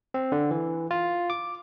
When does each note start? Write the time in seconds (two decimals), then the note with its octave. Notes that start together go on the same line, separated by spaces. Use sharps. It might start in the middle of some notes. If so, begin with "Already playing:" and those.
0.14 C4
0.32 D3
0.51 E3
0.91 F4
1.30 D6